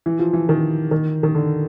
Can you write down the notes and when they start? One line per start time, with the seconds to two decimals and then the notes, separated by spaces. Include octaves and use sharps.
0.06 E3
0.19 F3
0.33 E3
0.49 D#3
0.91 D#3
1.23 D#3
1.35 D3